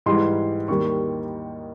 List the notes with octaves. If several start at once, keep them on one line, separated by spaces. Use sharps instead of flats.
G#2 E3 G3 C6
D#2 D#3 G3 C#6